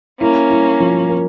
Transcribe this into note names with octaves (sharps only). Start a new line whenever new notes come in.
A#3 C#4 E4
E4
F3
A#4